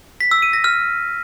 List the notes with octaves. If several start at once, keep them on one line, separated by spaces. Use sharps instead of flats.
B6
E6
D#7
A#6
F6